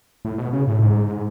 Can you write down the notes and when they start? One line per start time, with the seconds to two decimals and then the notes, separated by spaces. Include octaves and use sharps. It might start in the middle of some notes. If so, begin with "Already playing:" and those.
0.25 A2
0.38 B2
0.53 C#3
0.67 A2
0.82 G#2